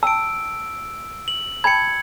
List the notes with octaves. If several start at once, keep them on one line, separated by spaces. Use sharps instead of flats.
G5 A5 E6 D7
F#7
G5 A5 B5 G#6 C#7